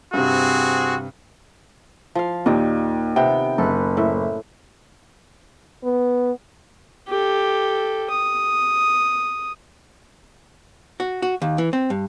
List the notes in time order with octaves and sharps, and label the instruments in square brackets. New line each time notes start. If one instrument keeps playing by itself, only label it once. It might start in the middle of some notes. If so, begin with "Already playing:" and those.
[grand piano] G2 C3 [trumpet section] C4 F#4 G#4
[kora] F3 F5
[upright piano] D#2 [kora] A#2 D#3
[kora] C3 B3 [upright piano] G5
[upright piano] F#1 [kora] A4 B4
[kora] A2 E5
[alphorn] B3
[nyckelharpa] G4 A4
D#6
[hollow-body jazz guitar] F#4
F#4
D#2
E3
C4
G2